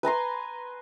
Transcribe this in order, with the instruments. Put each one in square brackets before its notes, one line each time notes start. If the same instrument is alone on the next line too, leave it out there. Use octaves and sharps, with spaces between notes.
[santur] B4 G#5 A#5 C6